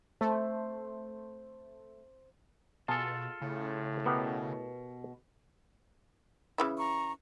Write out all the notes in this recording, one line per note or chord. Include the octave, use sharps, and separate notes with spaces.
A3 C5
B2 F4 G#4 A4 G#5 A5
A2 C#3
B2 B3 G4 A#4
C#3 E3 E4
A#5 C#6